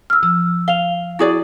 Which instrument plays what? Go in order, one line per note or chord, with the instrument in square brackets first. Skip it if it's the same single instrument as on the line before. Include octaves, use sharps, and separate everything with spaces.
[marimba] E6 F6
[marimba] F3 [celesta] E6
[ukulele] F5 [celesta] F7 G7
[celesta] E4 [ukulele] F#4 G#4 D5